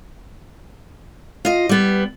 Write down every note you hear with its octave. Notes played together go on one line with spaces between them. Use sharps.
F4 D#5
G3 B3